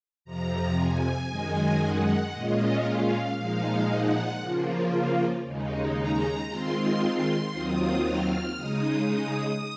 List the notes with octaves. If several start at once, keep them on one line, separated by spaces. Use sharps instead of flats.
F2 C3 F3 A#5
G#5
F#2 D#3 G#3 D#4
F#5
A#2 G#3 C#4 F4 D#5
F5
A#2 F3 G#3 D#4 F5
F#5
C#3 F3 A#3 F4
D#2 C#3 G#3 D#4
A#5
D#3 G#3 C4 F4 C6
D#2 D#3 F#3 C4 F4 D#6
F6
C#3 G#3 D#4 D#6
D#6